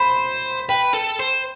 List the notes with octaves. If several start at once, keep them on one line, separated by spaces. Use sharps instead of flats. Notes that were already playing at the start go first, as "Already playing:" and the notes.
Already playing: C5 B5
B4 G5
A4
C5